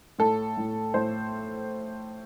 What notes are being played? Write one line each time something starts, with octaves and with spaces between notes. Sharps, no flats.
A2 A4
A2
A2 C5